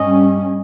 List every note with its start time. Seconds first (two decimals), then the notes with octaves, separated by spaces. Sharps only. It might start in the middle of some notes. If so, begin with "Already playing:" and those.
Already playing: G2 G3 C#4 D#5